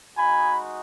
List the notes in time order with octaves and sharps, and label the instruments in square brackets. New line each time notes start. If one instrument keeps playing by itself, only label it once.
[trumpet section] G#3 D#4 F#4 G#5 B5